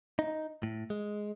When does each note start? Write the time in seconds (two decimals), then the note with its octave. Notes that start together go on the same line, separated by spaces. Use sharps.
0.19 D#4
0.63 A2
0.90 G#3